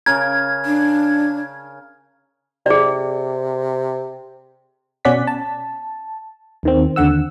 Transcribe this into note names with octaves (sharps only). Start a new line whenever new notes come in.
C#3 A#4 G#6
D4
C3 G#4 D5
B2 C#4 D5 F#5 B6
A5
D#2 D#3 C4
D#2 D3 F#5 E6